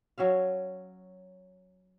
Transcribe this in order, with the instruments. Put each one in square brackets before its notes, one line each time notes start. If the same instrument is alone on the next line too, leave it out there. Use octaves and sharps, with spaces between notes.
[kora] F#3 C#4 E5 F5